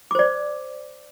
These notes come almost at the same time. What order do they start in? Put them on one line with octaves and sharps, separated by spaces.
D6 C5 D5